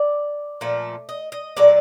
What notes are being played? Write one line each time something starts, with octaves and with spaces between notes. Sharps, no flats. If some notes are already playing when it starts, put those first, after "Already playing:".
Already playing: D5
A#2 F3 A3
D#5
D#5
A#2 F#3 A3 D5